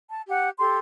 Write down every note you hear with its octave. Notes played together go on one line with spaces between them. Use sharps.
A5
G4 F#5
G4 A4 C6